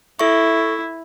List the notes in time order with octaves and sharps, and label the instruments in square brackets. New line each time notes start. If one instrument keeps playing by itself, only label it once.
[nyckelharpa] E4 [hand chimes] A4 E5 C#6